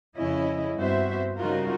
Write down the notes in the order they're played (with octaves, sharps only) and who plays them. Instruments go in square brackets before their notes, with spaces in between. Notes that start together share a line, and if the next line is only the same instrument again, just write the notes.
[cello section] F2 C#3 C#4 E4 D#5
G2 B3 C4 F#4 C5 E5
C#3 G3 D#4 F4 F#4 A#4